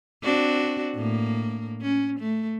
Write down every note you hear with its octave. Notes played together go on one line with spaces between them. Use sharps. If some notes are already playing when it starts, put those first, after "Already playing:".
C4 D4 F#4
A2 A#3
C#4
A3